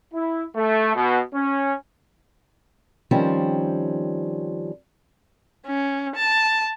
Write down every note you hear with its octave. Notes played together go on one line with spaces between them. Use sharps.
E4
A3
B2
C#4
D#3 F3 G3 C4 C#4
C#4
A5